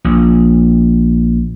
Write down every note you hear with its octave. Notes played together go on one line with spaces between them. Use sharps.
A#1